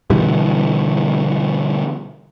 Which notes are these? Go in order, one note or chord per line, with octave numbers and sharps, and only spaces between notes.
B2 D3 E3 G3